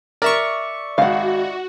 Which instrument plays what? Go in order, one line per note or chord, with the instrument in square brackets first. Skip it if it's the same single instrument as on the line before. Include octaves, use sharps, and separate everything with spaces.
[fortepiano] A#4 [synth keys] D5 E5 C#6
[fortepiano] G#1 [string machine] F#4 [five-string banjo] F5 F#5